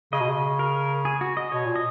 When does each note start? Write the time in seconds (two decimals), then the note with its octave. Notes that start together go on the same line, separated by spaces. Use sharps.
0.12 C#3 D#5
0.20 B2
0.29 C#3
0.59 A#4
1.05 G#4
1.21 F#4
1.37 D#5
1.52 B2 C#5
1.66 A#2
1.76 D#5